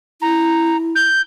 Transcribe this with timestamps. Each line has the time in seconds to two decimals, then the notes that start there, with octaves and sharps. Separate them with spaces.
0.22 E4 A#5
0.95 G6